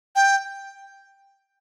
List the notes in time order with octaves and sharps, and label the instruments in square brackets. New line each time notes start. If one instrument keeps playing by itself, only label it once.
[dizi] G5